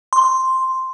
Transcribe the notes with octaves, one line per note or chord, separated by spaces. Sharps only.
C6